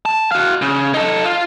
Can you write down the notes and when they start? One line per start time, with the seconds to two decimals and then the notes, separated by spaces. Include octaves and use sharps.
0.06 A5
0.32 F#4 F5
0.62 C#3
0.94 D#4 A4
1.25 F4